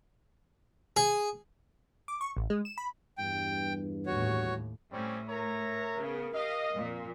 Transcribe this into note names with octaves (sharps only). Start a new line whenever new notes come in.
G#4
D6
C#6
A1
G#3
E7
B5
E2 G2 G5
D#2 A2 F#4 C#5
A2 G3 C4 C#4
A#4 C#5 E5 A#5
C#3 B3
G4 D#5 F5
F2 A#2